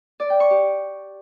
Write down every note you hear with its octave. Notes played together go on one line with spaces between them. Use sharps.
D5
G5
C#6
G4